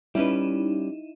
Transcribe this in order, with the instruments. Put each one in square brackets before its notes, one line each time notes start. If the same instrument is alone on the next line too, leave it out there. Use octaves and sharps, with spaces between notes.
[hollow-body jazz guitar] G3 C#4 B4 [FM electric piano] D#4 E4